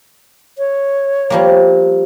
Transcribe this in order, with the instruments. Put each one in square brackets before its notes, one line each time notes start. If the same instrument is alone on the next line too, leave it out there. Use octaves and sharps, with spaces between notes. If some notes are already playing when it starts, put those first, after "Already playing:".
[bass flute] C#5
[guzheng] F3 G3 A#3